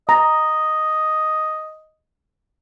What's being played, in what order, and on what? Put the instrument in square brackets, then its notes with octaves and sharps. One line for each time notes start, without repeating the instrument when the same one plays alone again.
[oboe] D#5 [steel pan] A#5